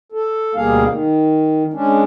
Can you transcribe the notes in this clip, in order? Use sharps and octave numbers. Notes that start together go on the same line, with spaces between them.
A4
D2 B2 G3 A#3 G#4 F5
D#3
G#3 C#4 D4